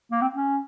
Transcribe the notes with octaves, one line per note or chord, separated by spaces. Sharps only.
A#3
C4
C#4